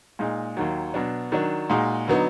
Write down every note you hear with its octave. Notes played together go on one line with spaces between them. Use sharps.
A#2 G#3 D#4
D#2 D#3 F#3
B2 F#3 D4
D#3 F#3 D4
A#2 G#3 D#4 F#4
D3 F#3 B3 D#4